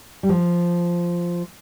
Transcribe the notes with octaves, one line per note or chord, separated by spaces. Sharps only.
G3
F3